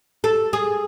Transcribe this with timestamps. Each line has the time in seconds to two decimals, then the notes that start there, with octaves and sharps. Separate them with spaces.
0.24 A4
0.53 G#4